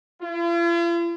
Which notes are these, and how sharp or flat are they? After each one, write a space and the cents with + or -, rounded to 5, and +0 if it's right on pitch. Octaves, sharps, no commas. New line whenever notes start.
F4 -45